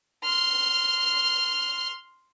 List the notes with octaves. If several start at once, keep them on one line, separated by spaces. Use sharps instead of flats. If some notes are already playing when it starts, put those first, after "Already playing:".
C6 F6